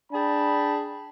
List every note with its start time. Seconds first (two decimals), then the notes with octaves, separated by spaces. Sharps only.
0.12 D4 G#4 G5 A5 B5